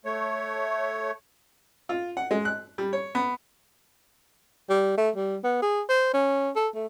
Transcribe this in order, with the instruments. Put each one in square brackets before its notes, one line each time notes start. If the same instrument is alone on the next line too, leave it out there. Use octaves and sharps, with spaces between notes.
[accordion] A3 C#5
[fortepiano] F4
F#5
G#3
F#6
G3
C#5
B3
[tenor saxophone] G3
A3
G3
B3
G#4
C5
C#4
A4
A3